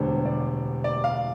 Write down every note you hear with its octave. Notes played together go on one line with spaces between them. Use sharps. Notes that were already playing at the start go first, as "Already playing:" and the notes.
Already playing: E1 D2 D3 G3 D4 C5
D5
D5
F5